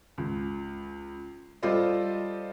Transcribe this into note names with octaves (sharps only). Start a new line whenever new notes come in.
C#2
G3 F4 A4 C5 D5 D#5